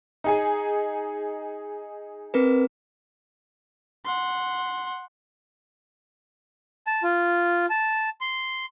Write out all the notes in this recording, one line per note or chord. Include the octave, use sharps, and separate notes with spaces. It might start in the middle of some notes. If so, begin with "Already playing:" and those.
D#4 G#4 G#5
C4 A#4 B4
F#5 C6
A5
F4
A5
C6